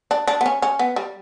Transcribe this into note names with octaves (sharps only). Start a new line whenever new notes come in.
D4
D4
B3
C#4
C#4
B3
G3